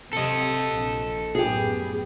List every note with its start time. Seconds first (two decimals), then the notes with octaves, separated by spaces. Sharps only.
0.13 C3 A4 D#5
0.69 A#1
1.35 F#2 A2 B3 G4 G#4